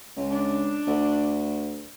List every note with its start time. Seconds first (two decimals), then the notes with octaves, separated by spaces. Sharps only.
0.16 C#2
0.30 D4
0.87 D2